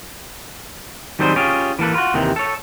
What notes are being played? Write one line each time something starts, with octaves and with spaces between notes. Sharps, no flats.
D#3 F#3 G3 C4 G#4 C5
C#4 F4 G4 G#4 C#5
E3 A#3 A4 B4
F4 F#4
D#2 C3 D#3 E3
A4 C#5